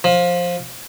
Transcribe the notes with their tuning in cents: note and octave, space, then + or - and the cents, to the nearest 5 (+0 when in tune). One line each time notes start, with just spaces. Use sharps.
F3 +15